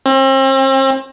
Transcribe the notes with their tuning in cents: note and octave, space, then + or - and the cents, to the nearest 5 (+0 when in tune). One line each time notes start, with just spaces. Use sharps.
C4 +40